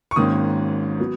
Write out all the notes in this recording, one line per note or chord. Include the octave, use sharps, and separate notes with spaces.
C#6
G#1 G#2 D#3 A#3 C#4 D#6
F#3 B3